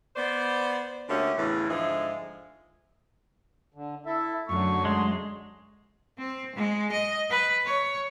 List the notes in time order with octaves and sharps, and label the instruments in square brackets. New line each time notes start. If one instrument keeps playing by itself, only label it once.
[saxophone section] B3 C5 D5
D2 D3 A#3 C#4 G4 E5
E2 A2 C#3 E3
G#2 D3 F3 G#3 G#4 E5
[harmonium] D3
[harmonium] E4 E5 [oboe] A4
[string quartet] F#2 F#3 [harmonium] D3 A3 [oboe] C#6
[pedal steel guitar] G#3 [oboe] C6
[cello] C4
G#3
D#5
B4
C#5